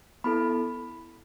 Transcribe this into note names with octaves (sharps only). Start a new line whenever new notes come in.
B3 E4 A4 B5